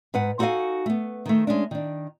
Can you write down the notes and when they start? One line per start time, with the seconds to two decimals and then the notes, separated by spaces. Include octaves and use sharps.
0.14 G#2 B4 F#5
0.39 D#4 F#4 A4 C5 F5 G#5
0.86 A3 B3
1.26 D#3 A3
1.47 G#3 C#4 D4
1.71 D#3 D4